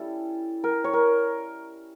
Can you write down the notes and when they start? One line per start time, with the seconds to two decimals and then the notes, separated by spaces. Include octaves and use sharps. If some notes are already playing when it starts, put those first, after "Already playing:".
Already playing: G3 C#4 E4 A4
0.64 A#4
0.84 C#5
0.93 A#4